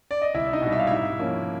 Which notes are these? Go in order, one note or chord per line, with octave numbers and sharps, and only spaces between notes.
D5
D#5
C2 E4 E5
D#4 D#5
B2 G3
E5
F5
G#2 E4 E5
F3 A#3 C#4